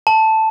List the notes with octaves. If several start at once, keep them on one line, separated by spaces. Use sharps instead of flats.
A5